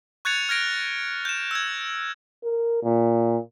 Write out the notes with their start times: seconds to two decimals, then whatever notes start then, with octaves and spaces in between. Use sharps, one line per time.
0.25 C#6 F#6 G#6 A6 C#7 F7
0.49 F6 G#6 A#6 D7
1.25 G6 E7
1.51 E6 G#6
2.44 A#4
2.83 A#2